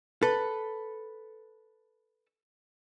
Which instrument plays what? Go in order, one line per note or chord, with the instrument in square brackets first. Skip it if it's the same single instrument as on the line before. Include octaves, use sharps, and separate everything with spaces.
[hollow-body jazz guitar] A4 B4